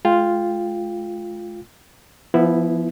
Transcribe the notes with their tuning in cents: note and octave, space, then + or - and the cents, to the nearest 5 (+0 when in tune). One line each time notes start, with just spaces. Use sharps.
G#3 +40 F4 +0 G5 +15
F3 -30 B3 -5 E4 +0